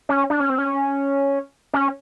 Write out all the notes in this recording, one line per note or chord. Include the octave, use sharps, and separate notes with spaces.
C#4
D4
C#4
C4
C#4
C#4